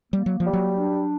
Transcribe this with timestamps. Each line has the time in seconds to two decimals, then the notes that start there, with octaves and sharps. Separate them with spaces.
0.13 G3 A#3
0.26 F#3
0.40 F3 G3
0.53 F#3
0.77 D4